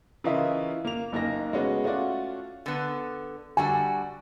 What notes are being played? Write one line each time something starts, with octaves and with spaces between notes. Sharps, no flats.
C#3 E3 F4 A#4 D#5 E5
A#3 F7
F#1 A#3 D#4 A#6
G#3 A3 B3 C#4 F#4
A3 C#4 F4 F#4 D5
D3 B3
D3 G3 F#4 G#5